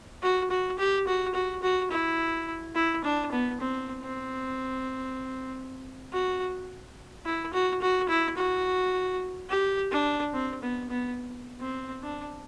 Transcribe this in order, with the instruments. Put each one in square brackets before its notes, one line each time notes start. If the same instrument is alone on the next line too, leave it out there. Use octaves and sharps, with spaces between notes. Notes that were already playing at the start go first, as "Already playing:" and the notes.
[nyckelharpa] F#4
F#4
G4
F#4
F#4
F#4
E4
E4
D4
B3
C4
C4
F#4
E4
F#4
F#4
E4
F#4
G4
D4
C4
B3
B3
C4
D4